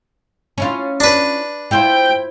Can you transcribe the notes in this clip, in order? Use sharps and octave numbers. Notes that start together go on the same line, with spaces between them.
C#4 E4 F4
D4 B4
E4 F4 C5 G5